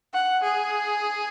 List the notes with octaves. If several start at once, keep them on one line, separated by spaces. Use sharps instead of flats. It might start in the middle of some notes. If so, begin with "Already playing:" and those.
F#5
G#4